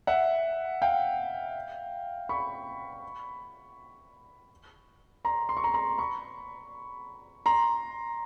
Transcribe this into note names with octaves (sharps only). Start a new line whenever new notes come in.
E5 F#5
F5 G5
B5 C#6
A#5 C6
C6
C#6
A#5 C6
A#5 C6
B5 C#6
A#5 C6